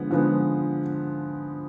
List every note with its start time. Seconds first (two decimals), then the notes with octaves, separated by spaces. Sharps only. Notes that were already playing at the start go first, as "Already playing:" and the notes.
Already playing: D3 F3 G#3 B3
0.11 D3 F3 G#3 B3